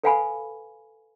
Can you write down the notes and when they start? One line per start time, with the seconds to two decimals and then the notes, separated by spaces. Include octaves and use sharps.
0.03 A4 B4 F5 F#5 G#5 B5